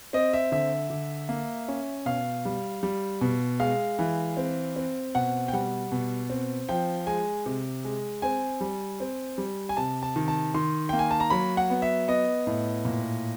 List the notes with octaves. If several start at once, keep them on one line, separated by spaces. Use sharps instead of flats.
C4 D#5
E5
D3 E5
D3
A#3
C#4
B2 F5
G3
G3
B2
G#3 F5
E3
C4
C4
B2 F#5
G5
G3 F#5
B2
C4
F3 G5
G#3 G#5
C3
G#3
C4 G#5
G3
C4
G3
G#5
C3 A5
A5
D#3
A5
D#3 C6
A#3 G5
G#5
A5
A#5
F#3 B5
F#5
B3
E5
B3 D#5
A2
A#2